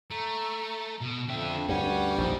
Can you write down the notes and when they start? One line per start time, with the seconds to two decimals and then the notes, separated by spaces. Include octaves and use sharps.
0.11 A3 A#5
1.02 B2
1.28 F2 D3 E5 G5
1.69 D2 G2 G3 C#4 F#5
2.18 A#1 F#2 A#2 D#3 C5